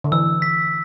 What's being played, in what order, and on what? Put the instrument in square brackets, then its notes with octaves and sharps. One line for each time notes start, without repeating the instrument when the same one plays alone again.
[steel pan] D3
[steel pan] E3 [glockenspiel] E6
[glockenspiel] B6